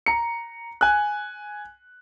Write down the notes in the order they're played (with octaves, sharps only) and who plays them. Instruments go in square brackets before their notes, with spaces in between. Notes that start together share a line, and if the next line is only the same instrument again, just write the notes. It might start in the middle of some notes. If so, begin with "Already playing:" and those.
[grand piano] A#5 C#7
G#5 F#6